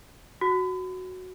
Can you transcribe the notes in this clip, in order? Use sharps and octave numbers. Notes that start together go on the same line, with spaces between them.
F#4